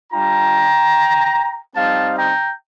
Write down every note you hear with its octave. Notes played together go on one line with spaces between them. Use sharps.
G3 D4 F4 G5 A#5
G3 C4 D#4 F5 A5
G5 A#5